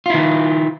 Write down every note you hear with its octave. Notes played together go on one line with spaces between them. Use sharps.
D#3 E4 F4